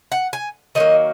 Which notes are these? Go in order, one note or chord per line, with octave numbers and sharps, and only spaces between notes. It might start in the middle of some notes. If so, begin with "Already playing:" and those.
F#5
G#5
D#3 F#3 A#3 D#5